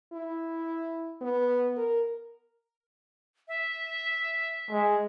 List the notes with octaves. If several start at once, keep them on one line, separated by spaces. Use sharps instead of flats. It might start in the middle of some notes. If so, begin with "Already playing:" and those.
E4
B3
A#4
E5
G#3